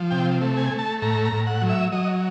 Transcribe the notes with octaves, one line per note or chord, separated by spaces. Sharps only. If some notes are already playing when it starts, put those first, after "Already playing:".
Already playing: F3
C3 G5
A3
G#5
A3
A5
A2 A#5
A#5
A2
F#5
F#3
E5
F#3 D#5